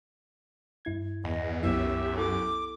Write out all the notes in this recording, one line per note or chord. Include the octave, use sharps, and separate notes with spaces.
G2 E4 G#6
E2 D#5
C2 F#2 B3 E4 G4 E5
E4 A4 D6